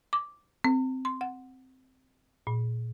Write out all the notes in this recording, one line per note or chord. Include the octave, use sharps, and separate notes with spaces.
D6
C4
C6
F#5
A#2